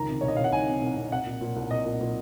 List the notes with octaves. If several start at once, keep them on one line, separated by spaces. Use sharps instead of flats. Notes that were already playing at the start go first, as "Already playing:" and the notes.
Already playing: C#2 D#3 A#5
C3
C2 C#5
D#5
C2 F5
F#5
D#3 G#5
C3
C2
C2
C2 F#5
A#2
A#2
C2
C2 D#5
A#2
A#2